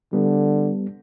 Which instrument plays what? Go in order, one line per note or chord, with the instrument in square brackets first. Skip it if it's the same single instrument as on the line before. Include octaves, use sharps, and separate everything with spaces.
[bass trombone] D3 [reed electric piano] G3 B3